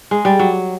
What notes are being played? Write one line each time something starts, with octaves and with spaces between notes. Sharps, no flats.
G#3
G3
F#3